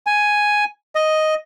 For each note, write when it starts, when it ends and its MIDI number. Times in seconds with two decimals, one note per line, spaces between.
0.07 0.64 80
0.95 1.34 75